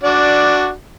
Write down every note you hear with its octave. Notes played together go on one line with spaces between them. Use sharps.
D4 F#4 D5